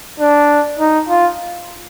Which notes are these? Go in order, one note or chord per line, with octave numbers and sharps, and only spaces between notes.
D4
D#4
F4